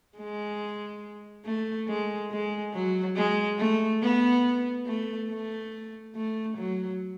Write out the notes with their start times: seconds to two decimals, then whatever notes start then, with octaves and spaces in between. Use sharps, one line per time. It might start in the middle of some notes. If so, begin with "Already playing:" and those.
0.17 G#3
1.45 A3
1.88 G#3
2.31 G#3
2.74 F#3
3.16 G#3
3.59 A3
4.02 B3
4.86 A3
5.29 A3
6.16 A3
6.58 F#3